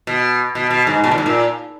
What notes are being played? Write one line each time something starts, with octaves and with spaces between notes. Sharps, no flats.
B2
B2
B2
G#2
B2
A#2
G#2
A#2